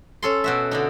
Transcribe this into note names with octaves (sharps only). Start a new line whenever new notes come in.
C#4 A4 C6
B2 F#4 E5
D3 D4 D#4